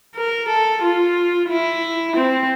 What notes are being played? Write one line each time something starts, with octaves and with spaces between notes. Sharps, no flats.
A#4
A4
F4
E4
C4